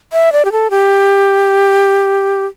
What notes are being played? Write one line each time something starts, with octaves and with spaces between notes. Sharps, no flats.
E5
D5
G4
A4
G4